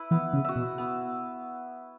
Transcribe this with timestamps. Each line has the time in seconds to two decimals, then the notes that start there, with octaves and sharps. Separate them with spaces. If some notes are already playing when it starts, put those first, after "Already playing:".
Already playing: E4 B4
0.11 E3 B3
0.33 C#3
0.45 F#4 E5
0.56 B2
0.78 B3